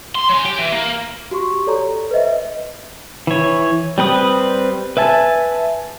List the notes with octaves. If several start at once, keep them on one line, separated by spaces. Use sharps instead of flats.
C6
F#3 G#5
G4 G5
E3
A#3
F#4 G4 C6 C#6
A4 C#5 D5 A#5
B4 C5 D#5 E5
E3 C#5
G3 C4 B4 D#6
B4 E5 G#5 A5